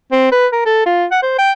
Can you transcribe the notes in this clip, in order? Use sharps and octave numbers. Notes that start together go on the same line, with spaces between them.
C4
B4
A#4
A4
F4
F#5
C5
G5